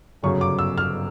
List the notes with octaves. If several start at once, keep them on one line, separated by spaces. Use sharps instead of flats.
G1 F#2 C#3 F#3 C#6
D6
E6
F6